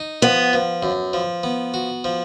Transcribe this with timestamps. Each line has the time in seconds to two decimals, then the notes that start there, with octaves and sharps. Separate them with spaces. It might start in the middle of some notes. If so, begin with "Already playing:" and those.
Already playing: D#4
0.22 F3 B3
0.53 F3
0.83 F#2
1.13 F3
1.43 B3
1.74 F#4
2.04 F3